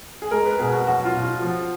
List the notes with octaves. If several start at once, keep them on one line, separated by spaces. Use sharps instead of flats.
G#4
G#3 A#4
B4
B2 G#4
F#4
F#3 F#4
F4
B2
F4
F3